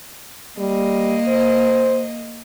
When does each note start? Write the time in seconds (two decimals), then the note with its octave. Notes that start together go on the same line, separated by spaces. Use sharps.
0.58 G3 A#3 D#5
1.28 C5